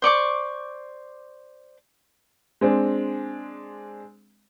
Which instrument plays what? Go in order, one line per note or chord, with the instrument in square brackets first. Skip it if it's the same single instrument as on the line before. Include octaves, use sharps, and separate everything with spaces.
[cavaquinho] C5 D5 C#6 D6
[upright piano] G#3 C4 D4